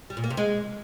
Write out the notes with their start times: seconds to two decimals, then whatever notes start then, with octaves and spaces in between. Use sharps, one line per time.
0.10 G3
0.17 A#2
0.24 A#3
0.31 C3
0.37 G#3